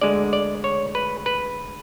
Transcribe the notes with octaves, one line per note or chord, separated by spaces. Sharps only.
D2 D3 G#3 D5
D5
C#5
B4
B4